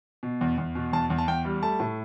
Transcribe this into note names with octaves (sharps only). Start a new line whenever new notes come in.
B2
E2
E2
B2
E2 A5
E2
A5
E2 G5
G3
A3 A5
A2